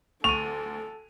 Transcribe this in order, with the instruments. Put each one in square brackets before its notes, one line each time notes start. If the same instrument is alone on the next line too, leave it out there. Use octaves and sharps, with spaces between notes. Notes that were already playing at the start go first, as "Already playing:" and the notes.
[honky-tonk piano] D2 [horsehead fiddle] A4 [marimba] C#6 [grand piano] D#7 F7